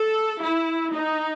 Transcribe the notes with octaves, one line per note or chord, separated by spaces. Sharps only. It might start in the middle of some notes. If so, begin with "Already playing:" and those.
Already playing: A4
E4
D#4